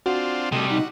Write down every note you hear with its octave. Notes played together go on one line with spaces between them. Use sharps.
C4 D4 F4 F#4
C3 G3 A3 D#5
D#4 F#4